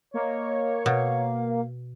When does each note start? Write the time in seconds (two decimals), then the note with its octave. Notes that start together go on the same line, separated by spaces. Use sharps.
0.14 A#3 C#5 D#5
0.86 B2 F5